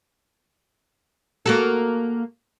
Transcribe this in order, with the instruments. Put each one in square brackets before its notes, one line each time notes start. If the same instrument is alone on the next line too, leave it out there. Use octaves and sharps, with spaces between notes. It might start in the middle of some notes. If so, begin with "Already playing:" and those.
[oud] A#3 F#4 A4